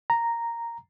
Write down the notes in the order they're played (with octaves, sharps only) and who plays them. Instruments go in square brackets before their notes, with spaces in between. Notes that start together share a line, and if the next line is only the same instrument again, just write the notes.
[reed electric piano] A#5